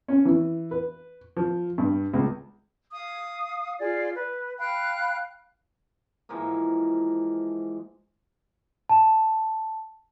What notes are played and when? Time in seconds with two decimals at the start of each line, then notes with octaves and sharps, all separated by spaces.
0.08 C#4
0.25 E3
0.71 B4
1.37 F3
1.78 G2
2.13 C#2
2.91 F5 D#6
3.80 F4 G#4 D5
4.15 B4
4.58 F5 G5 B5 F#6
6.29 G#2 E3 F3 A#3
8.89 A5